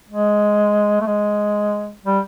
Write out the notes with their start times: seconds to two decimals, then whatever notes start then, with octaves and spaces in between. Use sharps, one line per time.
0.09 G#3
1.01 A3
1.06 G#3
2.05 G3